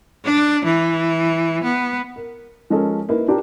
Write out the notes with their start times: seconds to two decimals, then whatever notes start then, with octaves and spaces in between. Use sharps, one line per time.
0.25 D4
0.65 E3
1.63 B3
2.16 A#4
2.70 F3 G#3 C#4 A4 A#4
3.09 A#3 D#4 E4 A#4 B4
3.28 D4 F4 G4 A#4 B4 A#5